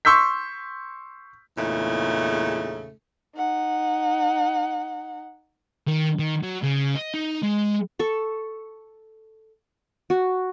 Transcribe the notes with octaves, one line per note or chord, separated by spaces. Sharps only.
C6 C#6 E6 G6 B6
E2 A#2 C#3 A3 D#4
D#4 F#5
D#3
D#3
F#3
C#3
D#5
D#4
G#3
A4 C#6
F#4